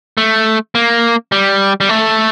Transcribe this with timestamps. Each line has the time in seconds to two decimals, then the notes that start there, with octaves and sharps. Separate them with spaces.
0.17 A3
0.75 A#3
1.32 G3
1.81 G3
1.89 A3